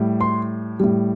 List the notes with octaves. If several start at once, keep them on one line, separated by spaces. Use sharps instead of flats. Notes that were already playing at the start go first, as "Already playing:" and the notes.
Already playing: A2 G3
C6
A2 G3